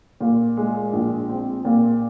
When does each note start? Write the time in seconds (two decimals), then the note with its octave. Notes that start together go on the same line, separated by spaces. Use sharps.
0.20 A#2
0.57 G#3
0.93 A#1
1.29 C4
1.65 A#2